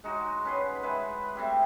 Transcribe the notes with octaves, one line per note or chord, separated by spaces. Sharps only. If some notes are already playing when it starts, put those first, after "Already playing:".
G#3 D#4 F#4
C#4 B4 C6
G#3 E4 B4 C5
A3 C4 E4 G4